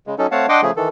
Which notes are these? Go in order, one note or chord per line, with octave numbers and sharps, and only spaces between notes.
C#3 G#3
F#3 C#4 D#4 A4
A3 C4 C#5 F5 F#5 A5
D4 D#5 F#5 G5 C6 D6
C#3 F3 A3 G#4
D#3 E3 A4